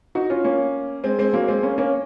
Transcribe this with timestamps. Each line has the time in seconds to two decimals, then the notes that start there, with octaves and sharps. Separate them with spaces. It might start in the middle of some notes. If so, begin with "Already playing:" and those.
0.15 D#4 F#4
0.30 C#4 F4
0.44 A#3 C#4
1.04 G#3 C4
1.18 G#3 C4
1.33 F#3 A#3
1.48 G#3 C4
1.63 A#3 C#4
1.78 A#3 C#4